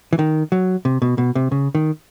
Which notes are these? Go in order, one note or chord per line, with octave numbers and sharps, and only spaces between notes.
E3
D#3
F#3
C3
B2
B2
C3
C#3
D#3